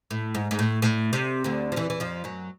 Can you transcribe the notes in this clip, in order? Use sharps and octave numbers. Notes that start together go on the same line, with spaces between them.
A2
G#2
G#2
A2
A2
C3
D2 D3
F3
E2 E3
E3
F2 F3
F#2 F#3